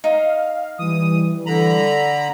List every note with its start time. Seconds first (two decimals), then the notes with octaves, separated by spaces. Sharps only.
0.04 D#4 F5
0.79 E3 G3 D#6
1.46 D3 A#5 B5